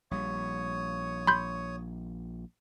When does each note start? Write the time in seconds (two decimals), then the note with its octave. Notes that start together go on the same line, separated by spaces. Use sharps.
0.11 A#1 G3 C#5 C#6 D#6
1.27 B5 C6 G6